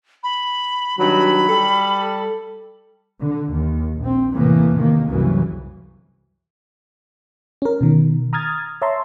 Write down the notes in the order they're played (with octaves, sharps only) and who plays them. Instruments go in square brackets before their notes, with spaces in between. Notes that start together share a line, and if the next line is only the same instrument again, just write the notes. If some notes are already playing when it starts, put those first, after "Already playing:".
[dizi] B5
[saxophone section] G2 D#3 F#3 [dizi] B5
[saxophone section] G3 A4
[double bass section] D3
D#2
A#1 C4
E2 A2 C3 E3 A#3
C3 D#3 A#3
C2 F#2 C#3 E3 F#3
[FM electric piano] C#4 A#4
B2 D#3
A#5 D#6 F6 G#6 A6
C#5 E5 A5 A#5 C6